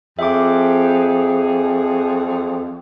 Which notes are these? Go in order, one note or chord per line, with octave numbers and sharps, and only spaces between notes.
F2 G#4 E5 D6